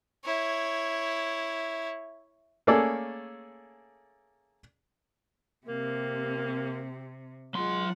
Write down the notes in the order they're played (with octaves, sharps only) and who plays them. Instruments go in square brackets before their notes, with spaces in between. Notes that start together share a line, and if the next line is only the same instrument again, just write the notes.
[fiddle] E4 C#5
[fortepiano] A3 A#3 C#4 G#4 A4 D5
[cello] C3 [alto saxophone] A#3 [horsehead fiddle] C4 G4
[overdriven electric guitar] F#3 C6 [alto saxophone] G#3 [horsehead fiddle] F4 F#5